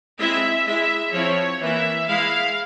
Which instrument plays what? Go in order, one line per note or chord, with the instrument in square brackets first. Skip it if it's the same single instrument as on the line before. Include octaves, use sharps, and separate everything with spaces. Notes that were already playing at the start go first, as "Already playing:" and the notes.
[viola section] G#3 C4 E4 E5
G#3 E4 E5
F3 C4 E4 C#5
E3 A#3 E4 E5
G#3 E4 F5